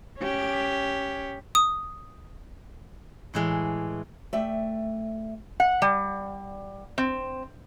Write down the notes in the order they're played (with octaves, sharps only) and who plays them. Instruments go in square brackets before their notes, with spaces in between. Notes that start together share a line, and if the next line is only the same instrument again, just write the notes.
[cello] C#4 G4
[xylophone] D#6
[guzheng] A2 E3 G#3
[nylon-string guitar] A3 D5 E5 G5
[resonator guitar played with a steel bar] F#5
G3
C4